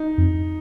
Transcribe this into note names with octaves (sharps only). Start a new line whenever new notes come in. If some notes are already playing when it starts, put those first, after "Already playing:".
Already playing: D#4
F2